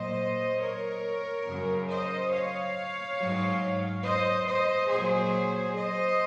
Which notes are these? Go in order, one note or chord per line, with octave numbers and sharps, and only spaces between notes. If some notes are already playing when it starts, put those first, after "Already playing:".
Already playing: A#2 F#3 C5 D#5
A#4 C#5
F#2 C#3 F#3
C5 D#5
C#5 F5
G#2 F#3
C5 D#5
C5 D#5
A#2 F#3 G#4 C5
C5 D#5